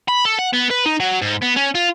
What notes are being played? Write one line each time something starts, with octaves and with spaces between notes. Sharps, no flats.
B5
A4
F#5
B3
B4
D#4
F#3
G#2
B3
C#4
F4